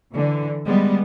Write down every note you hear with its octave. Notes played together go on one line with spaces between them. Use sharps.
D3 E3
G3 G#3 B3